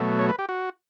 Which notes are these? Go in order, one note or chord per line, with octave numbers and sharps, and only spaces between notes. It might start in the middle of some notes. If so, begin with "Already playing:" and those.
Already playing: B2 F#3 A3
C#5
B4
G4
F#4